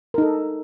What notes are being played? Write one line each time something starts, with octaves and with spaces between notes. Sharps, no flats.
D#4 A4 A#4